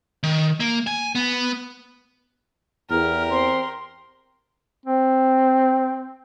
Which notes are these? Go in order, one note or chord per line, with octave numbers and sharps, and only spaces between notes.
D#3
A#3
G#5
B3
E2 G4 A#4 F6
C4 C6
C4